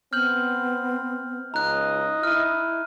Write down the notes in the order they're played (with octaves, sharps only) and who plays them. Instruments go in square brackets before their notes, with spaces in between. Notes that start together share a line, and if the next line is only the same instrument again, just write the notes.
[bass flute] B3 [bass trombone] C4 [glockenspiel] F6 G6 F#7
[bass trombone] C#2 [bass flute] D#4 [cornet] D#5 [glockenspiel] A#5 F#6
[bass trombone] E4 [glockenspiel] F6 D#7